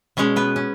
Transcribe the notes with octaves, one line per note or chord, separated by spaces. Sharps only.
B2 G#3 C#4 C#5
B3 B4
C#4